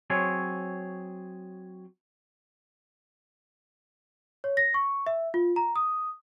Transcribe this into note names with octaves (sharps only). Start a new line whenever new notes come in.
F#3 C4 G#4 C#5
C#5
A#6
C#6
E5
F4
A#5
D#6